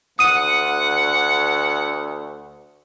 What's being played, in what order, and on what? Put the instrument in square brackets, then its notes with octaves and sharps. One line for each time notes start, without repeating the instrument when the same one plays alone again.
[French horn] D2 [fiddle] F#5 [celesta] D#6 D#7